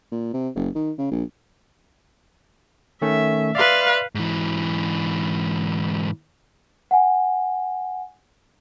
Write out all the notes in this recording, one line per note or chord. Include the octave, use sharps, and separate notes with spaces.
A#2
C3
F#1
D#3
C#3
A#1
D#3 A3 C#4 E5
B4 D5 E5 F5 C6
G#2 E3
F#5 G#5